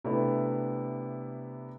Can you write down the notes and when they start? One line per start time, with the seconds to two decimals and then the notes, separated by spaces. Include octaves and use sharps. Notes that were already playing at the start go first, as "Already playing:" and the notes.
0.04 C3 A3 B3 D4 E4